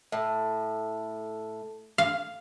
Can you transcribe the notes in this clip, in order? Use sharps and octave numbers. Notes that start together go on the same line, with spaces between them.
A2
F5